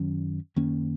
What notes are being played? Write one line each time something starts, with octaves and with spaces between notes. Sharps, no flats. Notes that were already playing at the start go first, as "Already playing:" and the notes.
Already playing: F#2 D#3 F#3 C#4
F#2 D#3 A#3 C#4